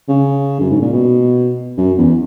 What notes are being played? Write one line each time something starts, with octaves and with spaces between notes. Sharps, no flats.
C#3
F#2
G#2
A#2
B2
F#2
E2